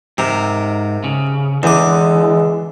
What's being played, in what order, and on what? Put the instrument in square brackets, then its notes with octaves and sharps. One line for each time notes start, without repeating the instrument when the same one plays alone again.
[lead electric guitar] G#2 A#4 [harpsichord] C3
[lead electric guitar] C#3
[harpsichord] E2 D6 [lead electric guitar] D3 E3 [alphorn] G#3